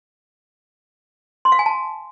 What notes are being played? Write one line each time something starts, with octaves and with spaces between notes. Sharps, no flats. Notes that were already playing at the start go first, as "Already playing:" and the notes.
C6
F5
G#5
A5